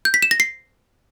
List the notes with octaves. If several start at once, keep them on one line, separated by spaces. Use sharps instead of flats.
G6
B6
E7
A#6
C7